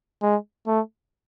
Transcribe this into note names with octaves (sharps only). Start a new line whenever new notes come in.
G#3
A3